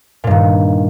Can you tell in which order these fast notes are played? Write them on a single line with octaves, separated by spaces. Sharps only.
A#2 G2 D#3